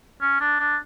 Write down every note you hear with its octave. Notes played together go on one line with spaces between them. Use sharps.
C#4
D4
D4